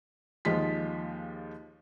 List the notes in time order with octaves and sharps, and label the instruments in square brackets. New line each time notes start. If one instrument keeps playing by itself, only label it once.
[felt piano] D#2 F3 G#3 F4 B6